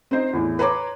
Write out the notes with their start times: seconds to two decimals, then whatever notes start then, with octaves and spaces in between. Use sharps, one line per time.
0.11 C4 D#4 C5 D#5
0.33 E2 A2
0.59 B4 C#5 A#5 C6 D6